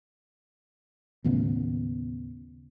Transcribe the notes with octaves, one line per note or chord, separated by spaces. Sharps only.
D#2 A2 C#3 B3